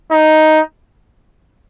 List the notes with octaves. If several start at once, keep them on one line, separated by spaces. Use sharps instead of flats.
D#4